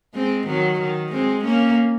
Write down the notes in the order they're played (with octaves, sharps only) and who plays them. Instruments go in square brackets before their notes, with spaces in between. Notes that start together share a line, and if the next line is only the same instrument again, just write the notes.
[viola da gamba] G#3 C4
D#3 F#3
D#3
G#3 C4
A#3 C#4